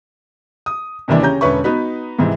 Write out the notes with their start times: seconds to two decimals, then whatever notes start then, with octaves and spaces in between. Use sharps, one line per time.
0.66 D#6
1.08 D#2 C3 D#3 E3 D4
1.21 C#3 C#4 G4 A#5 G6
1.41 E1 D3 C#4 B4 E5 C#6
1.64 B3 D#4 F#4 B4
2.19 G#2 C3 E3